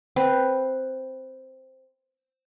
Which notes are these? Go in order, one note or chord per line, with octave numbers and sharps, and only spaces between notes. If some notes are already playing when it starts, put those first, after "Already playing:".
C4 B4 C5